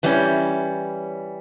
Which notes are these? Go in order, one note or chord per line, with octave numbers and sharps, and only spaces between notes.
E3 G3 A#3 C#4